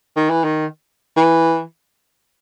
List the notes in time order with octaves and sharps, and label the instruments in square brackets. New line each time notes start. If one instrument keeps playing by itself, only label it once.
[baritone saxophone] D#3
E3
D#3
E3